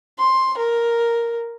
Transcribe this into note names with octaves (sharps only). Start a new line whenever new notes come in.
C6
A#4